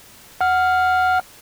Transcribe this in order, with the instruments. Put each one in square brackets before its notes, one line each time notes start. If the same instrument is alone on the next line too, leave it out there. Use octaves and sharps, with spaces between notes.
[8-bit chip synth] F#5 F6